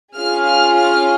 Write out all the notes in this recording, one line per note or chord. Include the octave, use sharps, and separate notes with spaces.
C#4 F4 G#4 F6
F6
F6